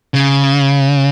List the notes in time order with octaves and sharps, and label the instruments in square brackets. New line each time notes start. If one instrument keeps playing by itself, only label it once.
[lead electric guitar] C#3